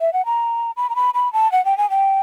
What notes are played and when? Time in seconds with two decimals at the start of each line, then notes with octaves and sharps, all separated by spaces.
0.01 E5
0.13 F#5
0.26 A#5
0.77 B5
0.90 A#5
0.96 B5
1.14 B5
1.33 A5
1.52 F#5
1.65 G5
1.78 G#5
1.90 G5